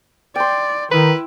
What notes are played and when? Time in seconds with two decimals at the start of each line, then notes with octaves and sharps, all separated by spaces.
0.36 D5 G5 C6
0.91 D#3 E4 B4